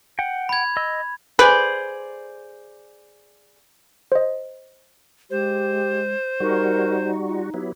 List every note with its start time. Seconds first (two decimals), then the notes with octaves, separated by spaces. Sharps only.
0.19 F#5 G5
0.49 B5 G#6
0.77 D#5 E6
1.39 G#4 B4 C5 D5
4.12 C5 D#5
5.30 G#3 G4 C5
6.40 G3 D#4 F#4 A#4
7.26 F4
7.54 F#3 B3 E4 G4